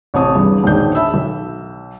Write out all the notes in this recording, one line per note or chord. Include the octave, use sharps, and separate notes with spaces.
A1 C3 C#5 A5 D#6
E2 G2
E1 A#1 G#2 D#3 D4 G6
E5 A5 B5 E6
B1